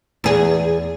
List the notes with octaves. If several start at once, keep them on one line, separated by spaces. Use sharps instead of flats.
E2 G#4